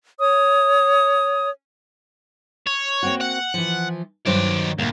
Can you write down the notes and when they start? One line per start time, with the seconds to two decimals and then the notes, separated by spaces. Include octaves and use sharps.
0.19 C#5 D#6
2.67 C#5
3.03 A#3 C4 F#4
3.21 F#5
3.54 E3 F3
4.26 G2 D#3 F#3 C5 D5
4.79 D2 A#2 A#3